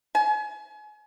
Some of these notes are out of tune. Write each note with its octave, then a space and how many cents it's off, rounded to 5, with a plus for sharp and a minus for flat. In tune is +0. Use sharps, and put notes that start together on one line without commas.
G#5 +35